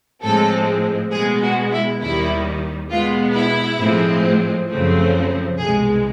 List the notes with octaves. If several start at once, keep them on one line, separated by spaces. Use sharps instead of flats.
A2 F3 G#3 C4 A4
B2 G#3 B3 G#4
F#4
E4
D#2 D#3 G3 E4
B2 G#3 B3 F4
E4
A2 F3 G#3 C4
F#2 C#3 F3 A3 C4
C2 B2 G#3 G#4